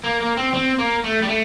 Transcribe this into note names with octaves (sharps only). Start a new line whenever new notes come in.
A#3
A#3
C4
C4
A#3
A3
G3
A3